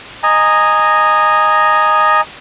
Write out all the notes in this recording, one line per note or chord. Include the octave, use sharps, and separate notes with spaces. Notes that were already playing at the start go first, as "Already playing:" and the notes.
D#5 G#5 A#5